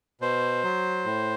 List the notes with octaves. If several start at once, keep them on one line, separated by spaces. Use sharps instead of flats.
B2 C5
F#3
A2